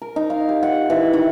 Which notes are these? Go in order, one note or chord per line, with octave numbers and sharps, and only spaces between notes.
A#4
D#4
F5
G4
F#5
E3
D#3